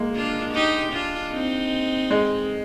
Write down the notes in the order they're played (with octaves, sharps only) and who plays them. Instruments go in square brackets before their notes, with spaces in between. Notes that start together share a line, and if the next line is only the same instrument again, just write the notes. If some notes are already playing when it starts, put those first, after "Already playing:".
Already playing: [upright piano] G#3 A#3
[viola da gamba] D4 F4
D#4 G4
D4 F4
C4 D#4
[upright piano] G#3